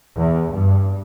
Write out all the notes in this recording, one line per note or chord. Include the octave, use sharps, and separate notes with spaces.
E2
G2